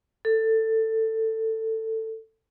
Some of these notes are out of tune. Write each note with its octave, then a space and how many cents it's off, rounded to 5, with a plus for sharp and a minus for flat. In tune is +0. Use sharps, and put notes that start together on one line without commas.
A4 +15